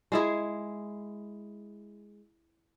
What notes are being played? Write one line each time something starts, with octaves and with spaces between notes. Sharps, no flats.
G#3 E4 G#4